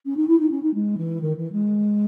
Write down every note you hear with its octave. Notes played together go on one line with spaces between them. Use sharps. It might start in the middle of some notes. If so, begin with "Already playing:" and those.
C#4
D#4
E4
D#4
C#4
D#4
G#3
E3
D#3
E3
G#3